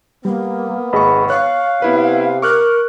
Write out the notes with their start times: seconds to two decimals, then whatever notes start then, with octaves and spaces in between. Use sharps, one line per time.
0.25 G3 A#3 B3
0.93 G#1 G#4 D#5 B5 C#6
1.30 C#5 F5 C#6 F#6
1.82 C3 B3 E4 B4
2.42 A#4 C#6 D6 F6 F#6